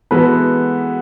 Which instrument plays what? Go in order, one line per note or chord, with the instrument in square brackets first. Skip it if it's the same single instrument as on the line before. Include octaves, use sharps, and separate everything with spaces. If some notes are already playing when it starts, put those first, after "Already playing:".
[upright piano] E3 G#3 B3 F#4 A4 [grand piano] B4